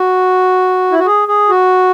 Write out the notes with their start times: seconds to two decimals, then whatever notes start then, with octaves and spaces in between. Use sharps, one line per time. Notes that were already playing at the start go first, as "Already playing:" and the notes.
Already playing: F#4
0.92 E4
0.99 F#4
1.06 G#4
1.28 G#4
1.49 F#4